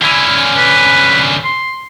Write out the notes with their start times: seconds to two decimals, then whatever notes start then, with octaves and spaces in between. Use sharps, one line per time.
0.02 D3 C#4 E4
0.57 B4
1.44 C6